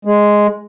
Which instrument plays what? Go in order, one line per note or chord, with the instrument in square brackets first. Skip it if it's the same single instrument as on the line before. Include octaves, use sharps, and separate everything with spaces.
[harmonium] G#3